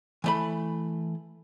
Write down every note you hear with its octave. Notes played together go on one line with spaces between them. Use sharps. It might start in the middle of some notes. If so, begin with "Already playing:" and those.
E3 A3 B5